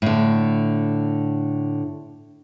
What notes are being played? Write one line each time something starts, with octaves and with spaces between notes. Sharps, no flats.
A2 D3